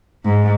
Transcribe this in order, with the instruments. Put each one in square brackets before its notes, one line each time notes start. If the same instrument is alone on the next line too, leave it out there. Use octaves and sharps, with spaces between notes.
[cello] G#2